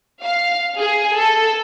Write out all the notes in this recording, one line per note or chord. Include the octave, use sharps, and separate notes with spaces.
F5
G#4
A4